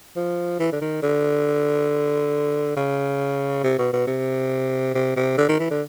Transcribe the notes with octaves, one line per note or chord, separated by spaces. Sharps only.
F3
E3
D3
D#3
D3
C#3
C3
B2
B2
C3
C3
C3
D3
D#3
E3
D3